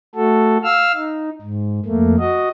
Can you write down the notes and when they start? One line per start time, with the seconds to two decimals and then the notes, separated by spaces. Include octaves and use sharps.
0.15 A3 F#4 A4
0.64 F5 E6 F6
0.95 D#4
1.42 G#2
1.85 F2 A3 A#3
2.19 F#4 D#5